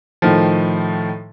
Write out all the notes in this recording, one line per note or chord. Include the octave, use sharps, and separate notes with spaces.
A2 D#3 F3